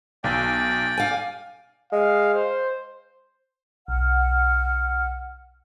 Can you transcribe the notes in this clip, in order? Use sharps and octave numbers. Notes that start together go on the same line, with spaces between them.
B1 D5 G5
F5 G#5
G#3 F5
C5
B1 F#5 F6